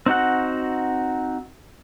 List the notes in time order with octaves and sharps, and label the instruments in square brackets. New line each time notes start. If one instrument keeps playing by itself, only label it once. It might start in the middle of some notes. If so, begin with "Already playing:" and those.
[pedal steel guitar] C4 D#4 F#4 F#5